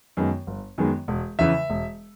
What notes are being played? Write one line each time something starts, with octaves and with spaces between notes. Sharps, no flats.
F#2 D#3 G#3 B3
G1
F#2 D#3 G#3 B3
E1
E2 C#3 E3 E5
E1